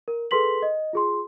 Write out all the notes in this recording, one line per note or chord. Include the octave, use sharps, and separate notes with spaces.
A#4
G#4 A4 B4 C6 B6 F#7
D#5
F4 G#4 C6